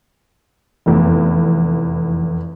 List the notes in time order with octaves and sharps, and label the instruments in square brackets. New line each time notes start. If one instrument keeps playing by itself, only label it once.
[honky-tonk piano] F1 E2